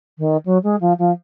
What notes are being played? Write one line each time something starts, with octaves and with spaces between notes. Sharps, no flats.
D#3
F#3
G#3
F3
F3